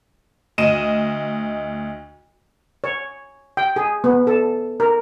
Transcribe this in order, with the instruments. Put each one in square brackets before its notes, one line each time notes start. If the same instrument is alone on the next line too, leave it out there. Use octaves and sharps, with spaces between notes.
[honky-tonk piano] D2 D#5 D#7 E7
[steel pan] C#5
G5
G#4
B3
A4
A#4